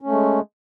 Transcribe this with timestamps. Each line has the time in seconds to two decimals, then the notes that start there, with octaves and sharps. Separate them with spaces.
0.02 C#4
0.06 A3
0.11 G#3